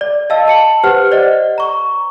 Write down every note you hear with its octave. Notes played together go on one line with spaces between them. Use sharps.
D5
D#5 F5 A5 E6
A5 C#7 F#7
G4 B4 C5 F#5 F6
C5 D5 D#5 F#5
A#5 C#6